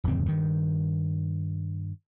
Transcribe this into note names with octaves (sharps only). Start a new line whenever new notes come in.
D1 F2 C#3 C4
G2 D#3